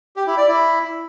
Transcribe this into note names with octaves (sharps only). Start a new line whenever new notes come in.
G4
E4
D5
E4